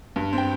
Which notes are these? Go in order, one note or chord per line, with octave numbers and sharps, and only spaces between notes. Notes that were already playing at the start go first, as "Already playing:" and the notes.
G2
C4
G5